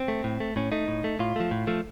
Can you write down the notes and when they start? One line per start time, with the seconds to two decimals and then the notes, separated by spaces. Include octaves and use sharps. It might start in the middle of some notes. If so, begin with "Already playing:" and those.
Already playing: C4
0.08 A3
0.24 A2
0.40 A3
0.56 A2 C#4
0.72 A3 D#4
0.88 A2
1.04 A3
1.19 A2 F4
1.36 F3 A3
1.51 A2
1.67 F3 A3